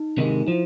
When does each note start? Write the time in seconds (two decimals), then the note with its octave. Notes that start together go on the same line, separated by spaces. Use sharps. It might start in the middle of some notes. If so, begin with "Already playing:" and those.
Already playing: D#4
0.18 C3 D#3 G#3
0.47 F3 E4